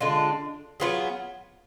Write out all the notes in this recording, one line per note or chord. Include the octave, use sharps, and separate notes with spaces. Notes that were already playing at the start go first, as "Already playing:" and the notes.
D3 G#3 D4 F4
F#3 B3 F4 G#4